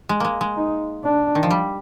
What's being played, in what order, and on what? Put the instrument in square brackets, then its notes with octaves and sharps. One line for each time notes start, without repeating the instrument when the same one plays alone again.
[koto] G#3
G#3 A#3
G#3
[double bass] D#4
D4
[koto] D#3
F3
G3